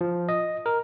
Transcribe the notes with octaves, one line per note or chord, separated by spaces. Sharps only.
F3
D#5
A#4